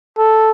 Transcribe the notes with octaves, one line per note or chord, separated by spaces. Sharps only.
A4